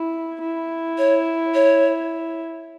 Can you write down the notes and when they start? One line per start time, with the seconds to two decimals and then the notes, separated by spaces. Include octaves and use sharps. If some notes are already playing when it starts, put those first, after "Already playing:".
Already playing: E4
0.42 E4
0.98 C#5
1.55 C#5